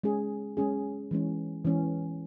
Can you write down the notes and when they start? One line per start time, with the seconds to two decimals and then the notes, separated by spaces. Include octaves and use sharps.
0.03 G#3 C#4 G#4
0.57 G#3 C#4 G#4
1.11 E3 G#3 C#4
1.65 E3 G#3 C#4